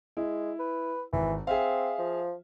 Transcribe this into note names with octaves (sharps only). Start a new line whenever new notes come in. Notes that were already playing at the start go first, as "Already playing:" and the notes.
G#3 E4
B4
G#1 E3
C4 G#4 E5 F5
F3